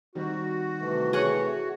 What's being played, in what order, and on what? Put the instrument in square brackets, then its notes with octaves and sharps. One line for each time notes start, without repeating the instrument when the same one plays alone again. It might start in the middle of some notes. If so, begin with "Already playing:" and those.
[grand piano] D#3 G3 C4 [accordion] F#4
[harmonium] C3 E3 A3
[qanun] G#4 C#5 F#5